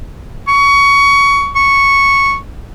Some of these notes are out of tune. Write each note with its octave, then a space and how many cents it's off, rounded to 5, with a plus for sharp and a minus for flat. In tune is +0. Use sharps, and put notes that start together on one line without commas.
C#6 +20
C#6 -5